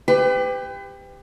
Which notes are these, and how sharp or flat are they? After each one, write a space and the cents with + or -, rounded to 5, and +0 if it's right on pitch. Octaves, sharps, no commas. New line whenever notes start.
G4 +20 B4 +40 B5 +35